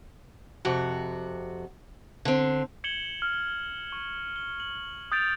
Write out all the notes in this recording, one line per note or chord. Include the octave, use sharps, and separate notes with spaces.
F2 C3 F#4
D3 C4
G#6 C#7 E7 F#7 G7
F6
C#6
G7
F#7
D#6 G6 A6 D7 F7